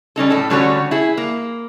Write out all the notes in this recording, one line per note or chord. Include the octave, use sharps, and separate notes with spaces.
G3 C#4 D#4 A4
A2 A4
D3 G3 A3 C#4 F#4 C#5
E4 G#4
A#3